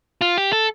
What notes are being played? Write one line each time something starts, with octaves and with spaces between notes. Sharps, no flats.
F4
G4
A4